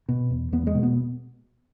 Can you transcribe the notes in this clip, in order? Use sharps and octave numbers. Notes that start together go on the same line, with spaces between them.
B2
E2
E2 B3
G#3
B2
B3